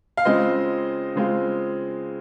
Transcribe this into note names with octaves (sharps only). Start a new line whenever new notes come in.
F5
C#3 G#3 C4 F4 D#5
C#3 G#3 C4 F4